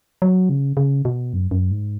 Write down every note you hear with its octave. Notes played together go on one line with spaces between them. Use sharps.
F#3
C#3
C#3
B2
F#2
F#2
G#2